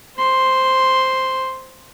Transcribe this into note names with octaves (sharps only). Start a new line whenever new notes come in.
C5 C6